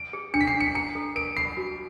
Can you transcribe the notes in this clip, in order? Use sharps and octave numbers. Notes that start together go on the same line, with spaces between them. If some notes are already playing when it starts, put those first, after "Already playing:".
Already playing: D7
G#4
D4 C#7
B6
C7
D4
C#7
A#5 C#7
A4
A#4 D7
B5 C7
F#4